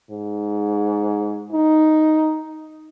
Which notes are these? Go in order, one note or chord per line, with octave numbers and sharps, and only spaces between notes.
G#2
D#4